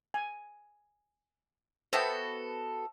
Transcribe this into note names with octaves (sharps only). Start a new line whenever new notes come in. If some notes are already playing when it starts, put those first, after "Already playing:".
G#5
B3 F#4 A4 C5 E5 G5